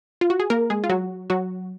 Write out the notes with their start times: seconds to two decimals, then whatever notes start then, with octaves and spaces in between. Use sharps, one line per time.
0.21 F4
0.30 F#4
0.40 G#4
0.50 A#3 A#4
0.70 G#3 G#4
0.84 F4
0.90 F#3 F#4
1.30 F#3 F#4